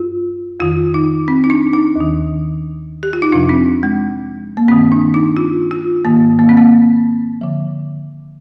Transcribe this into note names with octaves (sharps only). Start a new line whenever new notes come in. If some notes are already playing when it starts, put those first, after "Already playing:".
Already playing: G2 F4
F2 D#3 F4
D#4
C4
D#4
D4
D#4
D#2 D#3
G4
F4
D#4
F2 C3 F3 D4
C4
G#3
A#3
G2 D#3 C4
D4
D#4
F4
F4
G#2 D#3 A#3
A#3
C4
A#3
D3 F3